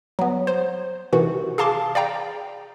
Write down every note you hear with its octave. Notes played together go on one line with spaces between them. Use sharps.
F#3 B3
C5
C3 D#3 E3 F#4
G#4 F5 A5 C6 D6
D5 F5 G5 A#5